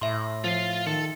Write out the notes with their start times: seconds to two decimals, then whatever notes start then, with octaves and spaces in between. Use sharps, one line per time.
0.01 A2 E5 C6
0.44 F3 F4 F5
0.87 D#3 A4